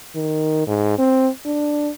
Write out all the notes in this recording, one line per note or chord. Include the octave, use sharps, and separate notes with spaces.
D#3
G#2
C4
D4